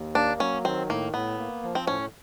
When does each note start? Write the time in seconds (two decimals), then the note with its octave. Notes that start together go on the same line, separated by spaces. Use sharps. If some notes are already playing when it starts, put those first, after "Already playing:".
Already playing: D#2
0.15 A#3 D4
0.40 F#3 C#4
0.65 D#3 C4
0.90 A2 A#3
1.14 A2 B3
1.39 A#3
1.63 F3
1.75 C4
1.87 A2 C#4